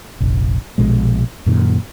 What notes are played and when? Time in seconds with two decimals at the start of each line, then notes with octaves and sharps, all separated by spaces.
0.20 F1 A#1
0.78 A#1 B2 G#3
1.46 F#2 A#2 D#3